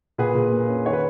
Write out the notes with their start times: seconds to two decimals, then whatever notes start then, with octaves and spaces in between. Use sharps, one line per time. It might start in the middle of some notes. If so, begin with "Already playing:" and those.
0.18 A#2 G#4 B4
0.35 A#2
0.52 A#3
0.69 C#4
0.86 D#3 C#5
0.93 B4